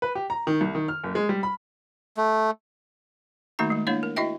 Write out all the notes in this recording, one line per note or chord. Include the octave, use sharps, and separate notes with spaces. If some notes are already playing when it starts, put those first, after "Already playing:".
B4
G4
A#5
D#3
C2
D#3
F6
F#1
G#3
G3
B5
A3
D#3 A3 A#3 D#4 F#4 A#5
G#3 A3
A#3 D4 E4 C#5 F5
A#4
E4 F#4 D#5 E5 G5